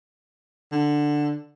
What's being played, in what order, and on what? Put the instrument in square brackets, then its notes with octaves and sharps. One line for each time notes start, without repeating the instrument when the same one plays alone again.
[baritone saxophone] D3